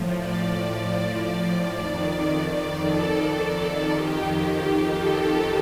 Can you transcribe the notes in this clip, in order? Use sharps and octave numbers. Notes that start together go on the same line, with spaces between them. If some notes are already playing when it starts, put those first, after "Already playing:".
Already playing: A2 F3
D5
D5
F2 D#3
A4
F2 D#3 G4
A4